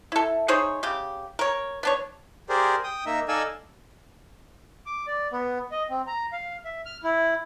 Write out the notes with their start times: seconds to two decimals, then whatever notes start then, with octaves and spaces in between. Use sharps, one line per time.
0.12 E4 A4
0.48 D#4 G#4 C5 C#5
0.83 C#3 G4
1.39 A#4 C#5
1.83 B3 D4 C#5
2.49 G4 G#4 A#4 C5 D5
2.84 G5 D#6
3.06 A#3 D#4 E5
3.28 D#4 A4 D5 F5 G#5 E6
4.86 D6
5.07 D5
5.32 B3
5.71 D#5
5.90 C4
6.07 A#5
6.32 F5
6.65 E5
6.86 F6
7.04 E4